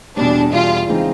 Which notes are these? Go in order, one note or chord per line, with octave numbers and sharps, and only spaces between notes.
E2 B2 G3 D4
E2 B2 G3 F4
C#3 E3 G#3 C4 D#4